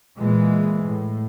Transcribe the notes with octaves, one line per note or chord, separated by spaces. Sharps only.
A#2 E3 G#3
A2